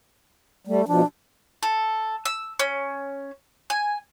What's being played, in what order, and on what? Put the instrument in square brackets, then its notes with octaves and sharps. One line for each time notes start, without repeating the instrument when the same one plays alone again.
[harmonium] G3 [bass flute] A3
[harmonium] B2 F3 [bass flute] D4
[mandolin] A4
E6
C#4
G#5